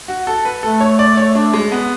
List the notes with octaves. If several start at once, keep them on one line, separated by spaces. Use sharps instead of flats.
F#4
A4
B4
A3 A4
C#5
D5
C#5
D4
G#3
B3